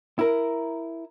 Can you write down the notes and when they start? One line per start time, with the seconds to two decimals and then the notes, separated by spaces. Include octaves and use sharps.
0.19 E4 A#4